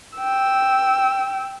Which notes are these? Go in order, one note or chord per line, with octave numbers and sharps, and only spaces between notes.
G5 E6